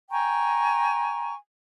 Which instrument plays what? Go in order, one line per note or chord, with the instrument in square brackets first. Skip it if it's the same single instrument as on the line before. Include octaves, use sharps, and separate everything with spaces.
[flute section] G5 G#5 A#5 C#6